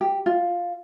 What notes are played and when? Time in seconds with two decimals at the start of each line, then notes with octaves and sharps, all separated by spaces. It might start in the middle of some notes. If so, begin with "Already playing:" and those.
0.01 G4
0.26 F4